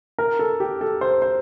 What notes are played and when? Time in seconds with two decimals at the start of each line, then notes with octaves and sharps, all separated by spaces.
0.18 A#4
0.39 A4
0.60 G4
0.81 A4
1.01 C5
1.22 C5